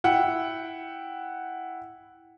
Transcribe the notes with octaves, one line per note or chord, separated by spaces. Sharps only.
E4 F#5 G5